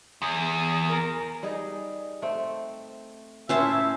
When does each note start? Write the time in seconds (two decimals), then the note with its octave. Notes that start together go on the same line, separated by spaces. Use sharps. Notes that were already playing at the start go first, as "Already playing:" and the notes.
0.22 E2 D#6
0.89 A#4
1.43 G3 D#4 G#4
2.22 A3 C4
3.49 A2 C#4 E4 C5 E5 A5